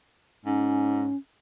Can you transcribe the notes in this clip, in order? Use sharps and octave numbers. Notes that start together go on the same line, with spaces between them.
G#2 C#4